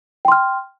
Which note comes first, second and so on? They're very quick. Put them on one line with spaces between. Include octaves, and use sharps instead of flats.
G5 C6 F6